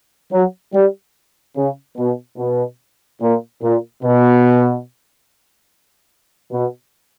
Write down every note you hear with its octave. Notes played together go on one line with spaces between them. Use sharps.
F#3
G3
C#3
B2
B2
A#2
A#2
B2
B2